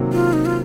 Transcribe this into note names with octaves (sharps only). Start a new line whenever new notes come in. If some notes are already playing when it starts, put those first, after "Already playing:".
Already playing: C3 D#3 F#3 A#3
F4
D#4
F4